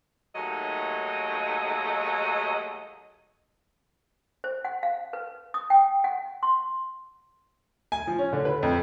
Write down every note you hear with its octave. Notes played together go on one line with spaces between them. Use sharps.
D#2 F#3 G#3 A3 D#4 D#5
C5
F#5
F5
B4
D#6
G5
F#5
C6
G#5
F3
C#4
D3
B4
F2